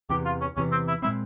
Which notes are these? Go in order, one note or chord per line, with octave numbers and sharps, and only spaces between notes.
E2 C3 E3 G4
F4
C#4
E2 C3 E3 C#4
C4
E4
A#2 G#3 C4 E4